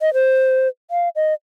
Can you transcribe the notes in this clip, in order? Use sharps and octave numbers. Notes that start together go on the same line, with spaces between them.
D#5
C5
F5
D#5